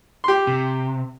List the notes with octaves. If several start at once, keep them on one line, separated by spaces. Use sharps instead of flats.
G4 C6
C3